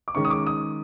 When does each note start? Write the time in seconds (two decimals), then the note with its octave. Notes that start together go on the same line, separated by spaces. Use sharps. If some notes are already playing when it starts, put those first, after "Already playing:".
0.08 D6
0.15 D#3 G#3 C#4 C#6
0.25 D#6
0.30 D6
0.47 D#6